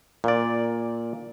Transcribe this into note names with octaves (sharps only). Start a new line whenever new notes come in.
A#2 D5